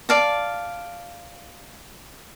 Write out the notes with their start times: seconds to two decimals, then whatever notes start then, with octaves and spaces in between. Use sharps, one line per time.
0.09 D5 F5 A5